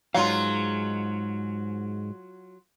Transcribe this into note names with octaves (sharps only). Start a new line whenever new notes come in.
G#2 F#3 F4 F5